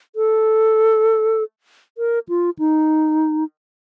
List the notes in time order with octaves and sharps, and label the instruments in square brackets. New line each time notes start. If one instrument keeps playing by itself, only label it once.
[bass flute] A4
A#4
F4
D#4